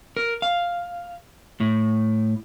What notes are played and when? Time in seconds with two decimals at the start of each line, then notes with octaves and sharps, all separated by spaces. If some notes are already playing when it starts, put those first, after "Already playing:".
0.17 A#4
0.42 F5
1.60 A2